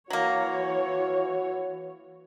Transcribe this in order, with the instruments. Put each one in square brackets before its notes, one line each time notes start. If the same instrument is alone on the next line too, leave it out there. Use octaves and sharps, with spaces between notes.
[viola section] E3 C#5 [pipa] F#3 A#3 [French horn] F#4